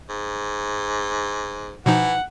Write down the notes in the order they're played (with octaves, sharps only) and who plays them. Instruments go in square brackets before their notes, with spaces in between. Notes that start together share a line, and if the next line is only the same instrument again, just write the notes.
[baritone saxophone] G#2
[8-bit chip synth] B2 F3 D#4 [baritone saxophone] E3 [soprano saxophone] F#5